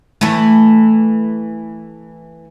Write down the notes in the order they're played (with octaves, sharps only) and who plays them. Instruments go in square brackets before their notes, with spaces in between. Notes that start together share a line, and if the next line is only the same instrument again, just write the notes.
[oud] E3 A3